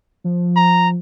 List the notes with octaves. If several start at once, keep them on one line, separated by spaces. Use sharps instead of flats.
F3
A#5